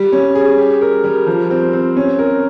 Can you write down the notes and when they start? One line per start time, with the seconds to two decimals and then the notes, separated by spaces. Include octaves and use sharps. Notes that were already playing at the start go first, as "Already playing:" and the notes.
Already playing: G3
0.12 C#4
0.35 G#4
0.58 G4
0.81 A#4
1.04 G3
1.27 F3
1.50 C4
1.73 C4
1.97 C#4
2.19 A#4